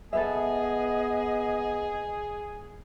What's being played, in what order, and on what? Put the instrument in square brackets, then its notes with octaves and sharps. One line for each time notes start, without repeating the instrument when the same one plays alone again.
[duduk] B3 [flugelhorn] G#4 [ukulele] A4 B4 E5 [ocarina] D#5